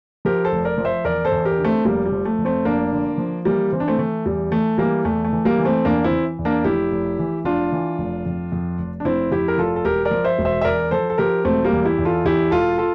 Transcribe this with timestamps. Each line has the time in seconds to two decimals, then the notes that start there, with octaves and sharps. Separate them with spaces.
0.25 F3 G4 A#4
0.44 A4 C5
0.52 F1
0.65 A#4 D5
0.78 F3
0.85 C5 E5
1.04 E2 A#4 D5
1.25 A4 C5
1.32 E2
1.45 G4 A#4
1.58 D3
1.64 A3 C4
1.85 F1 G3 A#3
2.06 G3
2.12 F3
2.25 A3
2.39 F1
2.45 A3 C4
2.65 F1 A#3 D4
2.92 D3
3.18 F3
3.45 E3 G3 A#3
3.72 E3 C4
3.80 D4
3.88 A3 C4
3.99 E3 A3
4.26 E2 G3
4.51 E3 A3
4.78 E3 G3 A#3
5.05 E2 A3
5.24 A3
5.32 E3
5.45 G3 A#3
5.58 E3
5.65 A3 C4
5.85 E2 A#3 D4
6.04 C4 E4
6.11 E3
6.39 E2
6.45 A#3 D4
6.64 F1 E4 G4
6.92 F1
7.19 E3
7.44 F1 D4 F4
7.72 E3
7.99 F1
8.26 F2
8.52 F2
8.79 F1
9.00 D4
9.05 F1 C4 E4
9.31 F2 E4 G4
9.48 A#4
9.58 F1 F4 A4
9.76 A4
9.85 E1 G4 A#4
10.05 A#4 D5
10.11 F3
10.24 C5 E5
10.39 E1
10.45 C5 E5
10.61 E5
10.64 E2 A#4 D5
10.91 F3 A4 C5
11.10 A4
11.18 F3 G4 A#4
11.44 E1 A3 C4
11.64 G3 A#3
11.72 E2
11.85 E4 G4
11.98 E2
12.05 F4 A4
12.24 E2 E4 G4
12.51 E1 F4 A4
12.78 F4 A4